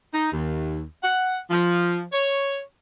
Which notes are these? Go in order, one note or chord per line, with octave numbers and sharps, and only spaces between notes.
D#4
D#2
F#5
F3
C#5